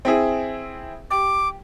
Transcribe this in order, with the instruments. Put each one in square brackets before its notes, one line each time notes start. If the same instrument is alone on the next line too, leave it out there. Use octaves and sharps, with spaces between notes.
[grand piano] C4 E4 G#4
[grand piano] G4 [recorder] D6